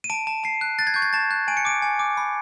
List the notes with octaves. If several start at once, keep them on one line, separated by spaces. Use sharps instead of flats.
D#7
A5 D7
A5
A5 C7
F#6
F#6 A6
G#6
C#6 G6
G#6
A5 A6
F#6
G#5 D7
C#7
D6 D7
G#5
D6
B5